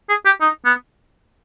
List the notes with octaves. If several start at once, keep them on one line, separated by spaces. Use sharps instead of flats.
G#4
G4
D#4
B3